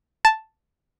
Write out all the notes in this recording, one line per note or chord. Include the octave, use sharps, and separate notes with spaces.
A5